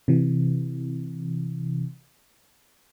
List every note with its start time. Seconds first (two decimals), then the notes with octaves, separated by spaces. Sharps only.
0.08 C3 E3